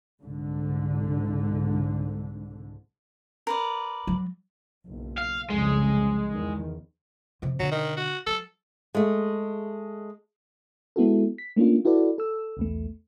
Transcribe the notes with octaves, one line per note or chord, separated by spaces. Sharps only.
C2 G#2 D3
A#4 B4 D5
F#3
F#1 B1
F5
C2 F2 C#3 G#3
E2 D#3
F2 C3
B2 D3 F#3
D#3
F#4
F#3 A4
G#3 A3
G#3 B3 E4 F#4 A4
B6
A3 A#3 C#4 D4 F4
E4 F#4 A4 B4 D5
A4 E6
B1 E2 A3